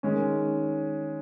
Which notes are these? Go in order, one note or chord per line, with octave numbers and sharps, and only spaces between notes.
D#3 G#3 C#4